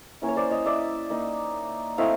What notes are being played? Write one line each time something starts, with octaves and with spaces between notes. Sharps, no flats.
A#3 C#4 E4
C#5
C5 D5
C#5 D#5
D5 E5
A#3 D#4
A3 C4 E4 D#5 F5